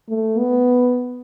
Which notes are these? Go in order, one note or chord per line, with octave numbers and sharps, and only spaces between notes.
A3
B3